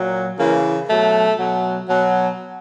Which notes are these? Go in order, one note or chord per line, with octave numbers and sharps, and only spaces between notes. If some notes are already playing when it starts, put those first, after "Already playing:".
Already playing: A#2 F#3
C#3 E3 A#3
B2 F#3 A3
B2 F#3
B2 F#3